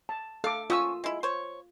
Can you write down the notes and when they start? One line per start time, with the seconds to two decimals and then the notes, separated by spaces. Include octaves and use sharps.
0.09 A5
0.44 A4 F5 D6
0.70 C#4 F4 F#5 C#6 D#6 E6
1.04 G#3 E4
1.23 C5 C#5